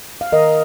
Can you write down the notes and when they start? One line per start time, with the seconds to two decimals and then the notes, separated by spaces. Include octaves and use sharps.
0.21 F5
0.32 D#3 A#4 D#5